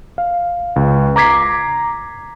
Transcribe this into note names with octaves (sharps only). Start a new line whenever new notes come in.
F5
C#2
A#5 D6 G#6 B6 C7